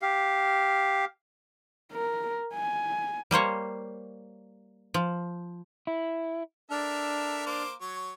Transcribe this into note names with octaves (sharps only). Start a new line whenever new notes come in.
G4 F5
A#4
G#5
G3 A#3 C5 C#5
F3
E4
D4 A4 A#4 E5 F6
A#3 C5 D6
F#3 C#5